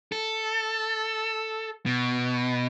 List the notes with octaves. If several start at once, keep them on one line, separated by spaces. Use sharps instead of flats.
A4
B2